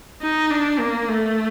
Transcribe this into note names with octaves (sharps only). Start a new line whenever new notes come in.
D#4
D4
A#3
A3